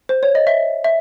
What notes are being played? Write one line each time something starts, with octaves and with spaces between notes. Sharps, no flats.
C5
C#5
D#5
E5
E5